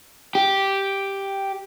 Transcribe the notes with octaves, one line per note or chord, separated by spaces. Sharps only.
G4